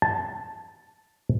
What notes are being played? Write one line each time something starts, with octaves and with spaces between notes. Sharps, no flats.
A5